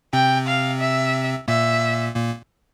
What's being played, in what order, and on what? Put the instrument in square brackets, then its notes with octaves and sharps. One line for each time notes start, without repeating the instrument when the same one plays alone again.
[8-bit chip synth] C3 C4 [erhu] G5
[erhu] F5
E5
[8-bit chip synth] A#2 A#3 [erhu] E5
[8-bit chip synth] A#2 A#3